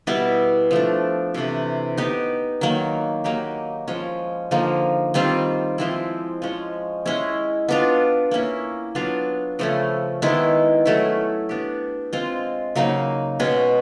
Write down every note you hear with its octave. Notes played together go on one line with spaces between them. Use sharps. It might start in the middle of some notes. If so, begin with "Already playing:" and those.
B2 G3 B3 E4
F3 A3 D4
C3 E3 A3 D4
B3 D#4 G4
D#3 F#3 A#3
F#3 A#3 D#4 G4
F3 G#3 C#4
D3 F3 A#3 D#4
D#3 G3 C4 F4
F3 G#3 C4 E4
F3 G#3 C#4
G#3 C#4 E4
B3 D4 F4
A#3 C#4 E4
F#3 B3 D4 F4
C#3 F3 A3 C#4
D#3 G#3 B3 E4
F#3 A3 C#4 E4
B3 D4 G4
G#3 C4 F4
C#3 F#3 A#3 D#4
B2 G#3 C#4